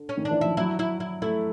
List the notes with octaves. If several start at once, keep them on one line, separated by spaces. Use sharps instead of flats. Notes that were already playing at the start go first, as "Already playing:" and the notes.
Already playing: D3
C#4
D#3
D4
E3
F3 E4
F#3 E4
E4
E4
A3 E4